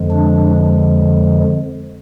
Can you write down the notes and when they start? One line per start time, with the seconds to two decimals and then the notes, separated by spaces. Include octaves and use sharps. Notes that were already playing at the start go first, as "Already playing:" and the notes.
Already playing: F2 D3 F3 G#3
0.11 D4